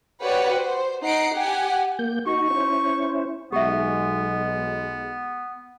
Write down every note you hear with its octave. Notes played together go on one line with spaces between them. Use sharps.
F#4 G4 B4 C#5 D5 F#5
C5
D#4 F#5 C7 D7
G4 F#5 G#5
A#3 G6
D#4 F#4 C#6
C#4 E4 C5
B1 G#3 B3 G4 E5